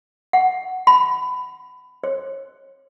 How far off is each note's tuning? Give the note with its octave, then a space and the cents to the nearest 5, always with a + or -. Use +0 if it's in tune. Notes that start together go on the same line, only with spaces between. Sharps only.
F#5 +10
B5 +20
C#5 -35